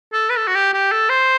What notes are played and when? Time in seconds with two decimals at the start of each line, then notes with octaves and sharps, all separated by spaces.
0.13 A4
0.30 B4
0.37 A4
0.48 F#4
0.55 G4
0.73 G4
0.92 A4
1.09 C5